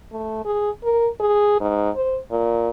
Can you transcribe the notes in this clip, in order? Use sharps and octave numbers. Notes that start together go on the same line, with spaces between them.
A3
G#4
A#4
G#4
G#2
C5
A#2